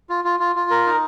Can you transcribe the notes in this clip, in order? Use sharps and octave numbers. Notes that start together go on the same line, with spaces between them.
F4
F4
F4
F4
A#4
D#4